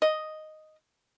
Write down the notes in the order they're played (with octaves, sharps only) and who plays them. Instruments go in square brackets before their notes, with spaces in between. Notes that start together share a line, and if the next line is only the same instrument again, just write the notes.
[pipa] D#5